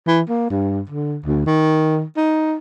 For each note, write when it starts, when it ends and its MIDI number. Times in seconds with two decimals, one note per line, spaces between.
0.07 0.21 52
0.29 0.46 58
0.50 0.81 43
0.89 1.16 50
1.26 1.43 38
1.46 2.03 51
2.17 2.55 63